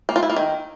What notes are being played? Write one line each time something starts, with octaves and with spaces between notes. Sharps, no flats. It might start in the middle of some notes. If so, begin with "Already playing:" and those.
A#3
F4
E4
A#3
D#3